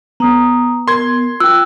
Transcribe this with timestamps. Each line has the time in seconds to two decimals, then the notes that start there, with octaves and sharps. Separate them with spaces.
0.20 B3 A#5 D#6
0.88 A#4 C6 G#6
1.40 F4 G5 E6 F#6